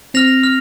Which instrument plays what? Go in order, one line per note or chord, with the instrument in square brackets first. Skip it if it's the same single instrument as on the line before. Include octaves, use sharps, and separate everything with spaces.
[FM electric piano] C4 [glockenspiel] F6 A#6 F7
[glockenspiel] F6